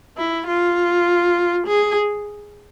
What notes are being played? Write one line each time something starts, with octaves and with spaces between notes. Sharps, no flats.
E4
F4
G#4